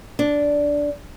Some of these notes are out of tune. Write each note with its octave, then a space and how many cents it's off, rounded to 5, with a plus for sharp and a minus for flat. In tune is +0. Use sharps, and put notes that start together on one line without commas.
D4 -10